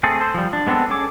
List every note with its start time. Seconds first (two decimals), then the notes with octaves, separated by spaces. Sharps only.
0.03 A3 C4 G#4 A4
0.21 A4 C5
0.34 F3 G3
0.53 D4
0.67 G#3 B3 C4 D4 A4
0.90 C#4 G#4 A4 G#5 D6